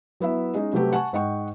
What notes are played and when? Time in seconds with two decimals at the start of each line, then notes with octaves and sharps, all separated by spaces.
0.20 F#3 B3 E4 E5
0.54 G#3 C#4 D#4
0.73 C3 F#3 G3 A3 G4 B4
0.93 F#5 G#5 A5 C#6
1.13 G#2 D#5 F#5 G5 C#6